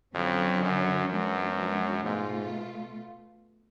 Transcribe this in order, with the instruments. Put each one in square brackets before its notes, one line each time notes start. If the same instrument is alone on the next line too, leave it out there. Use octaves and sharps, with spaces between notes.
[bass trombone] F2 [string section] D3 F#3 C#4 F#4
[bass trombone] F#2
[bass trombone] F#2 [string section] F3 G#3 B3 D4 F#4
[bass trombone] G#2 [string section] B2 A3 F4